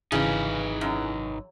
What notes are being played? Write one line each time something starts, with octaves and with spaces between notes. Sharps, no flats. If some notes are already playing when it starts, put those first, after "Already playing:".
G#1 C#3 E3 D#4 G#4 B4
F#2